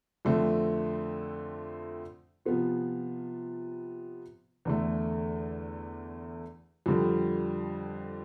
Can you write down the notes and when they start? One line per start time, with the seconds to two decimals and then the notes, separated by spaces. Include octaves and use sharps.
0.25 F2 D3 A3 C4
2.45 C3 F3 B3 F4
4.65 E2 D3 A3
6.86 F2 D3 G3